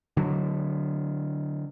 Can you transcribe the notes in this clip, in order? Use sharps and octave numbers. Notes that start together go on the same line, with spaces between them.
D3 F#3